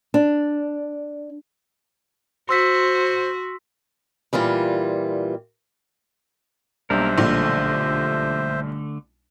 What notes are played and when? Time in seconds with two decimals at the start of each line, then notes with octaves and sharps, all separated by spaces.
0.14 D4
2.49 F#4 C5 C6 E6 B6
4.33 A#2 E3 G3 F4
6.90 B1 G3 A#3 D4 A#4 C5 E5
7.18 A#1 D3 A3